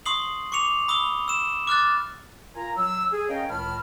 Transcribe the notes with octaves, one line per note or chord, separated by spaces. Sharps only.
C6 C#6 D#6 C7 F#7
C#6 D6 C#7 F7
B5 D#6 E6 G7
E6 E7
D6 F6 F#6 A6
F4 A#4 G#5 A#5
F#3 E6
G#4
C#4 A#4 C#5 D#5 F5 G5
C#2 A2 D#3 A5 B5 F6